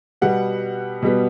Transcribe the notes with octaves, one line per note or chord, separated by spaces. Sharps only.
B2 G3 B3 F#5
B2 G3 B3